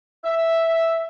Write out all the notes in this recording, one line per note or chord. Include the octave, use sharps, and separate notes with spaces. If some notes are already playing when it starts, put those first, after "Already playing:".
E5